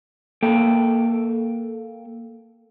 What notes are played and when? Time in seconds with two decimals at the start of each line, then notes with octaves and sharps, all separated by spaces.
0.42 A#3 A4 G5